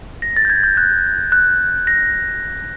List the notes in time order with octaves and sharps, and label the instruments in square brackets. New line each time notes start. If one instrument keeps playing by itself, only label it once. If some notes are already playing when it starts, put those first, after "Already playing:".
[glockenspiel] A#6
A6
G6
G#6
G6
F#6
F#6
A#6